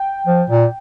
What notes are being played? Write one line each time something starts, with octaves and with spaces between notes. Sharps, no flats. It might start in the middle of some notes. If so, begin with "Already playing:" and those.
Already playing: G5
F3
A#2